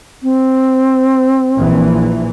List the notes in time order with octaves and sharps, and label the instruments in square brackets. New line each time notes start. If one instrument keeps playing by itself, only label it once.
[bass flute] C4
[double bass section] A#1 E3